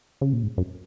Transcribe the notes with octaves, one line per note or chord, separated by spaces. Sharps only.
C#3
A#2
G#2
F#2